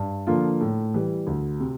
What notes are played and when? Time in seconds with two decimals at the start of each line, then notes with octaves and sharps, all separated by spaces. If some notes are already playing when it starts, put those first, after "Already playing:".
Already playing: G2
0.27 D3 F3 A#3 F4
0.61 A2
0.94 E3 G3
1.27 D2
1.60 C3